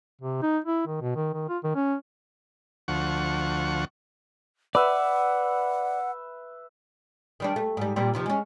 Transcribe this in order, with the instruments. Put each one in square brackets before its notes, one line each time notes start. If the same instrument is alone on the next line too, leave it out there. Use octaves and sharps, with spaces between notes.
[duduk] C3
D#4
E4
D#3
B2
D#3
D#3
F4
D#3
C#4
[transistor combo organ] D2 F3 F#5 C#6
[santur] B4 E5 [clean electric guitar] D5 [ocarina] F#5
[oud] D#3 G3 D4
A3
G#2 G3
A#2 G3 C4
D#2 C3 F3
G#3 C#4